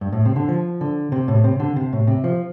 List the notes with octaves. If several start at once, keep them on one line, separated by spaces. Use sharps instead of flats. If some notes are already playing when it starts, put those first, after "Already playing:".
G2
A2
C3
D3
F3
D3
C3
A2
C3
D3
C3
A2
C3
F3